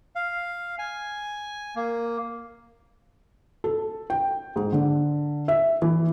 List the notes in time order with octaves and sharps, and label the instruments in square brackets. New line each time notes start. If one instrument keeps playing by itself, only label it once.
[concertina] F5
G#5
A#3
[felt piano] A4
G5
G#2
D3
E5
E3